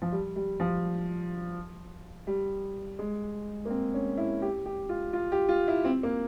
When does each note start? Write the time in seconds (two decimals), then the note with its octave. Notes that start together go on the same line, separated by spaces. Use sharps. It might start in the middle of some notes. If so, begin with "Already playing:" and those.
0.02 F3
0.12 G3
0.36 G3
0.60 F3
2.27 G3
2.99 G#3
3.65 A#3
3.70 C4
3.94 C#4
4.17 E4
4.42 G4
4.65 G4
4.89 F4
5.13 F4
5.32 G4
5.49 F4
5.68 E4
5.85 C4
6.03 A#3